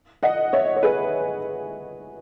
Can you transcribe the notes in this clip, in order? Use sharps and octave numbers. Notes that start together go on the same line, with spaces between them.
D#5 F#5
C#5 E5
C#5
G#4 B4